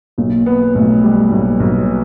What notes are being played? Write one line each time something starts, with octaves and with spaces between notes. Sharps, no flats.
B1 A#3
B3
B1 A3
G3
B1 A#3
B1